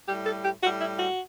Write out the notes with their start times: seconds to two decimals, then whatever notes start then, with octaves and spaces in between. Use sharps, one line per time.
0.06 A2 G3 G4
0.25 A4
0.44 G4
0.62 A2 G3 F#4
0.80 E4
0.98 F#4